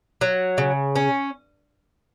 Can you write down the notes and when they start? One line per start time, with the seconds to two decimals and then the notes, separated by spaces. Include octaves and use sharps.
0.21 F#3
0.58 C#3
0.96 C#4